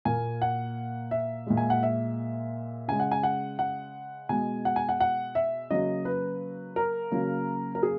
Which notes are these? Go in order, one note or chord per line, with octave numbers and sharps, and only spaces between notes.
A#2 A#3 G#5
F#5
E5
A#2 G#3
G#5
F#5
E5
C#3 G#3 G#5
F#5
G#5
F#5
F#5
B2 G#3 G#5
F#5
G#5
F#5
F#5
E5
C#3 F#3 A#3 D#5
B4
A#4
C#3 F#3 A#3
A#4
G#4